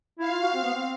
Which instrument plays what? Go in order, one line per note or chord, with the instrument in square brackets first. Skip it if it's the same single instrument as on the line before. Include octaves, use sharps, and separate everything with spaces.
[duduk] E4 [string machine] F5
[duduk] F4
F#4
C4
B3
C4